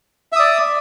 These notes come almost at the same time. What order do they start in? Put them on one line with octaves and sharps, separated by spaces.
E5 D#6 D5